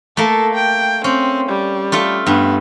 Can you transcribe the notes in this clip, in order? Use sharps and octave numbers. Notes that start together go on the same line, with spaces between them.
A3 A#3 A4
G5
C4 C#4
G3
A3 F4 A4
G2 B3